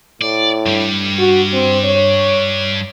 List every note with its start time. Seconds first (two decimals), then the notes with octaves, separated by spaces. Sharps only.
0.21 A2 D5
0.66 G2 G3
1.18 F#4
1.53 C4
1.85 C#5